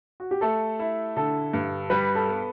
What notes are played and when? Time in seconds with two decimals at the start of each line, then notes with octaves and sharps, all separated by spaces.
0.20 F#4
0.31 G4
0.41 A3 A4
0.79 E4
1.16 D3 A4
1.53 G2
1.90 G3 B4
2.15 A4
2.28 B3